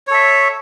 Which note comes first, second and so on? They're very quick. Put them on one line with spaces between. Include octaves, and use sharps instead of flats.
C#5 A4 E5